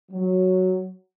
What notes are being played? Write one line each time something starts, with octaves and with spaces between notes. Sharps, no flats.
F#3